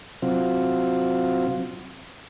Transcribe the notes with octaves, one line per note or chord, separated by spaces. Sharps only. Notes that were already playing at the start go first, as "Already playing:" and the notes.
C3 F#3 C4 F4